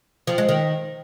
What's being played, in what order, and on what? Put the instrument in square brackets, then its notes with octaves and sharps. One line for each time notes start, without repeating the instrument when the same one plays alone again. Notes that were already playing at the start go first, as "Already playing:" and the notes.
[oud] F3
G#3
D#3